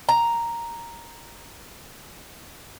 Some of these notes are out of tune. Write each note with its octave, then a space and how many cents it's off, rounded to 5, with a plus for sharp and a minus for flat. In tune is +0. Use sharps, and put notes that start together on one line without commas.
A#5 +0